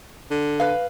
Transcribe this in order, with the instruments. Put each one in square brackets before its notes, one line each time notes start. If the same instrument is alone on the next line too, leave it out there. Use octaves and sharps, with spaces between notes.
[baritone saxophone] D3
[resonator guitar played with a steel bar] B4 F5